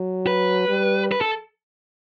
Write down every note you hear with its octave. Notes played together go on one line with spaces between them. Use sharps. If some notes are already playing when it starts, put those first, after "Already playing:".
Already playing: F#3
B4
G3
B4
A4